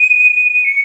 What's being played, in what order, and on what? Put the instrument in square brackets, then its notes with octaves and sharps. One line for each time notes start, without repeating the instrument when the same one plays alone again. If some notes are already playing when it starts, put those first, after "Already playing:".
Already playing: [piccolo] D#7
C#7